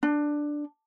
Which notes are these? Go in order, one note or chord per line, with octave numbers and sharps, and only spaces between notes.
D4